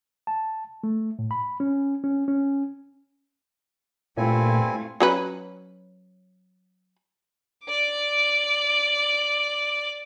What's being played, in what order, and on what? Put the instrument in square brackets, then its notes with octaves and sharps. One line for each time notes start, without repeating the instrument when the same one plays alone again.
[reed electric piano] A5
A3
A2
B5
C#4
C#4
C#4
[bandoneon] G2 C4 G#5 [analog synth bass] A#2 [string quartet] A3 F4 [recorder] E4
[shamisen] F#3 C#4 B4
[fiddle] D5 D6